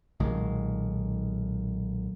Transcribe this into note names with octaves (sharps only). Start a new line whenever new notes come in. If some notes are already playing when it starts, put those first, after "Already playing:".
B1 A#2 D#3 G#3